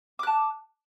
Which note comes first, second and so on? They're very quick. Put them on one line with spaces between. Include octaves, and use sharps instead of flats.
D6 F#6 A5